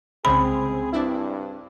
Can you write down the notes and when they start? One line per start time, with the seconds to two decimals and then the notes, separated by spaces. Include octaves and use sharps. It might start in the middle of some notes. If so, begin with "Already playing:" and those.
0.25 C2 C#3 G#3 C4 G#4 B5
0.93 G2 D4 E4